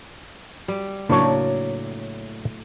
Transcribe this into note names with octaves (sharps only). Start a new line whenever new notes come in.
G3
A2 C#3 F#3 A#3 D4 C#5 D5 A5